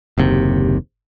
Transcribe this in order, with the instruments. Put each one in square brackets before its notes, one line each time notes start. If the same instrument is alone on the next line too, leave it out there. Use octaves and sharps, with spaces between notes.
[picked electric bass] F#1 D#2 C3